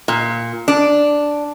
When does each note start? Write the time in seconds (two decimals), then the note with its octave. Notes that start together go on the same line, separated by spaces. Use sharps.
0.08 A#2
0.68 D4